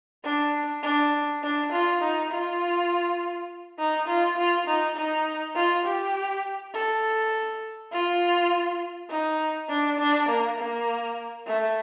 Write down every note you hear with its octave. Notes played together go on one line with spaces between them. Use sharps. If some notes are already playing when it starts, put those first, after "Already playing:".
D4
D4
D4
F4
D#4
F4
D#4
F4
F4
D#4
D#4
F4
G4
A4
F4
D#4
D4
D4
A#3
A#3
A3